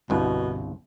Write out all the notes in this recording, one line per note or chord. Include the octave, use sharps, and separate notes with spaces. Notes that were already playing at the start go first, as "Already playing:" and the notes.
G1 C2 B2